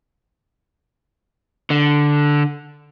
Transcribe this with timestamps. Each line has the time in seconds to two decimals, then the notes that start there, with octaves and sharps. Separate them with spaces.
1.70 D3